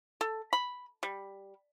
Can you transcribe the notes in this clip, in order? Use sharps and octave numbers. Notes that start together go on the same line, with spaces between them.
A4
B5
G3